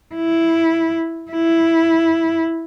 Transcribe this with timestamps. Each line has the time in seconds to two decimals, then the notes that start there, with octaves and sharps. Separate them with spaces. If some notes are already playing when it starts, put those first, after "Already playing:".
0.15 E4
1.32 E4